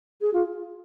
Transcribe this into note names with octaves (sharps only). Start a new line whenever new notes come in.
G#4
F4